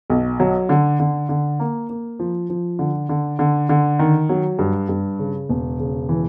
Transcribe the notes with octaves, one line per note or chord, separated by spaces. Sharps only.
B1
F#3
D3
D3
D3
A#3
A#3
F3
F3
D3
D3
D3
D3
D#3
F#3
G2
G2
C#3
E1
C#3
E3